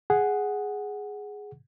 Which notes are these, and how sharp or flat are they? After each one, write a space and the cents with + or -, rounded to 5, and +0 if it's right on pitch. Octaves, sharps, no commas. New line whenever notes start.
G#4 +0 F#5 +0